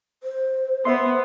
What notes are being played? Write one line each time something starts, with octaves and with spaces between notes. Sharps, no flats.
C5
B3 C5 E5 C6